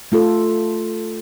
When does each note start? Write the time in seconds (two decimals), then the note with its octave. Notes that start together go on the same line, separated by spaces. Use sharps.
0.12 A3 F4 A4